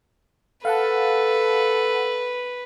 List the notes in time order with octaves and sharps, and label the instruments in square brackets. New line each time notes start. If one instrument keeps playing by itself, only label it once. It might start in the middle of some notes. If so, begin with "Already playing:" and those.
[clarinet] A4 [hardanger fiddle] B4 [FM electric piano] F5 F#5 A5